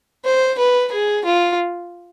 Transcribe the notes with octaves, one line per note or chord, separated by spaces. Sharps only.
C5
B4
G#4
F4